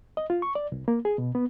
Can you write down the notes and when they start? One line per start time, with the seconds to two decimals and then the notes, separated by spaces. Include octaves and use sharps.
0.17 D#5
0.30 F4
0.42 C#6
0.55 D5
0.72 C2
0.88 A#3
1.05 G#4
1.18 B2
1.35 B3